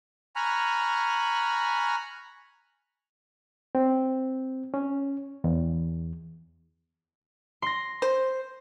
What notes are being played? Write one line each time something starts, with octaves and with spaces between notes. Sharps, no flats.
G#5 A#5 B5 C#6 F6 F#6
C4
C#4
E2
C6 A#6
C5